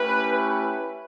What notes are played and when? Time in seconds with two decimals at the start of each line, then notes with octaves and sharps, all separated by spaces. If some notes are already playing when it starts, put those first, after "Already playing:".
Already playing: A3 C#4 E4 G4 B4
0.33 B4